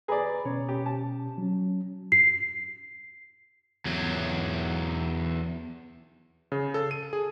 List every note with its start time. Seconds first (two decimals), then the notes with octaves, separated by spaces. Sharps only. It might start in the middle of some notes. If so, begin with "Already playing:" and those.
0.08 G#4 B4 D5 A#5 B5
0.45 B2 C#4 C#5
0.69 G4
0.86 A5
1.38 F#3 C#4
2.12 C7
3.86 E2 F#3
6.52 C#3
6.74 A4
6.91 D#7
7.13 G#4